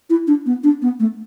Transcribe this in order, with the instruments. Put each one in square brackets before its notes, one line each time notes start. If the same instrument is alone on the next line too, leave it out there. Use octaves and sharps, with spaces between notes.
[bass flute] E4
D4
B3
D4
B3
A3